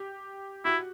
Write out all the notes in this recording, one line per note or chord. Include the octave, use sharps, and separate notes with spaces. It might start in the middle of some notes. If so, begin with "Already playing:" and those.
Already playing: G4
E4 F#4